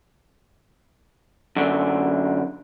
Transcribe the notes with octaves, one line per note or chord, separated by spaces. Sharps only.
F#2 D3